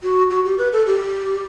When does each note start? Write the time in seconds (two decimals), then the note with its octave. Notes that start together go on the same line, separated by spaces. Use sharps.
0.03 F#4
0.30 F#4
0.45 G4
0.58 B4
0.73 A4
0.86 G4